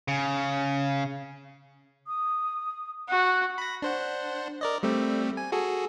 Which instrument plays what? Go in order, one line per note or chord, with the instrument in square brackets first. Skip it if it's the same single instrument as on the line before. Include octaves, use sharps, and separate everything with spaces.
[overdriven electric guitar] C#3
[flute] D#6
[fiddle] F#4 [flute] F#6
[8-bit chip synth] B5 A#6
D4 C5 F#5
A#4 D5 D#5
G3 A3 C4
G#5
F#4 G#4 A4